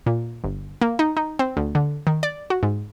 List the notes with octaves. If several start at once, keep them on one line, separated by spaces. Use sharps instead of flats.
A#2
G1
A#3
D#4
D#4
C4
D2
D3
D#3
D5
F#4
G#2